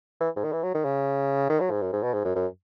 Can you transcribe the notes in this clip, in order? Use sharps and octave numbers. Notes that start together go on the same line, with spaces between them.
E3
G#2
D#3
E3
F#3
D#3
C#3
D#3
F#3
G#2
F#2
G#2
B2
G#2
F#2
F#2